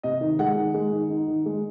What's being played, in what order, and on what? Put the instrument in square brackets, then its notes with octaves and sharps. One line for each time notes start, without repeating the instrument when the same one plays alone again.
[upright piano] C3 D#5
D#3
G#3 F#5
D#3
G#3
D#3
D#4
D#3
G#3